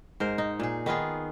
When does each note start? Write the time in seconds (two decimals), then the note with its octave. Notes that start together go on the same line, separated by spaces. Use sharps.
0.20 G#2 A#4 C5
0.38 D#4
0.60 A#2 G#4
0.86 D#3 B3 F4 G#4